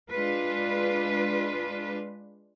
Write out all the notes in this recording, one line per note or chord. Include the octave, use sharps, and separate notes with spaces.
G#3 D4 F4 B4